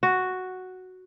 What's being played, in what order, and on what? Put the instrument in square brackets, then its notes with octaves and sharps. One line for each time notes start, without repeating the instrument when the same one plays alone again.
[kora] F#4